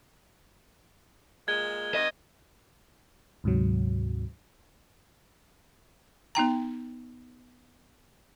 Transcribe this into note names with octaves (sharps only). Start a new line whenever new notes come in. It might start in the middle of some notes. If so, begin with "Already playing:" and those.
A#2 G#3 G#6 G7
G2 B3 D#5
D2 G#2 C3 F#3
B3 D#4 G5 A#5